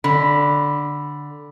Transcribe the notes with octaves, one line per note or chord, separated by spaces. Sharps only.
D3 B5